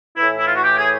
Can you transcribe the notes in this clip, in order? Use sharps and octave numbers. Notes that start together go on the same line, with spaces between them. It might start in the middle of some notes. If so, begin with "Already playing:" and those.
A2 E3 E4
E4
F4
F#4
G4
G#4